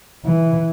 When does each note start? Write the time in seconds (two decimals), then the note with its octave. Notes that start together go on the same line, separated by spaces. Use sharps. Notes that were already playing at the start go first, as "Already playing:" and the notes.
0.25 E3